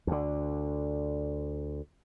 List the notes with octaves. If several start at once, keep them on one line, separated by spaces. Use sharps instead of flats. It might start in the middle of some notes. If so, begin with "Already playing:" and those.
D2 D3